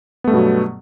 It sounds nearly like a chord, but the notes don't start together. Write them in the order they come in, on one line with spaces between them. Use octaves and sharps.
B3 A3 G2 B2 F#3